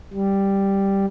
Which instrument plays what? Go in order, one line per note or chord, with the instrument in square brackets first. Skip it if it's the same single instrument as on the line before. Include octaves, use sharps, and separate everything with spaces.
[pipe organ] G3